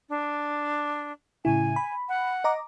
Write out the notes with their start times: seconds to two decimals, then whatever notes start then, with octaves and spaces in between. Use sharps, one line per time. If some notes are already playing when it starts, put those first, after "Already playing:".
0.09 D4
1.45 A2 C#3 E4 G#5
1.76 B5
2.09 F#5
2.44 D#5 A#5 D6